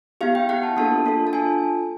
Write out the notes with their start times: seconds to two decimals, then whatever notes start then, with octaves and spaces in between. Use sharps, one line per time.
0.21 B3 E4 G4 F5
0.35 G5
0.49 B3 E4 G4 F#5
0.63 A5
0.77 A#3 D4 F4 A4 A5
1.06 A#3 D4 F4 A4
1.27 A5
1.33 D4 F4 A4 G#5